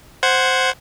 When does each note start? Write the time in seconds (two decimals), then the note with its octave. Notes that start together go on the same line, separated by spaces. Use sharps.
0.23 C5 F#5 G#6